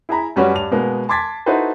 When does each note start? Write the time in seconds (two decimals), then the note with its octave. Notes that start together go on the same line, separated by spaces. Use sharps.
0.09 E4 G#4 E5 A#5 B5
0.36 F#2 G3 C#4 F#4 B4
0.54 G2 F7
0.71 B2 G#3 A#3 B3
1.09 A5 C6 D6 G#6 A6 B6
1.46 D#4 E4 F#4 A4 B4 C5